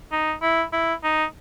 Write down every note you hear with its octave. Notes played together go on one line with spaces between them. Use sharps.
D#4
E4
E4
D#4